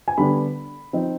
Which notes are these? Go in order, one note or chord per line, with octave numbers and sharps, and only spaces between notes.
G#5
D3 G3 B3 D4 B5
F3 C4 D#4